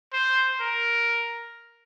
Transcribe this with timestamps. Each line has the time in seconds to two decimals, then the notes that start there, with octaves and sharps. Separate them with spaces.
0.13 C5
0.60 A#4